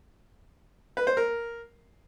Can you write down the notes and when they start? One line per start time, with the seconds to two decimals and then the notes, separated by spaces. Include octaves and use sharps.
0.97 B4
1.07 C5
1.17 A#4